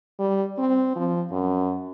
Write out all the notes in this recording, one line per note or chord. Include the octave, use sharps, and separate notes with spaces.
G3
C4
F3
F#2